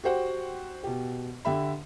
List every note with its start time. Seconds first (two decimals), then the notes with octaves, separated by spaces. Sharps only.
0.04 F#4 G4 C5 F#5 G5
0.83 B2 G4
1.45 D3 G4 E5 B5